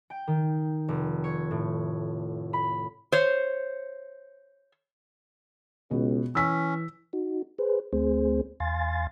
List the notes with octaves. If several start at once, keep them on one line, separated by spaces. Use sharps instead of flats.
G5
D#3
F1
C#5
A2
B5
C5 C#5
C#2 B2
E3 C#4 E6 B6
D#4 F#4
G#4 B4 C5
D2 A3 C4 G#4 C5
E2 F5 G#5 C6 A6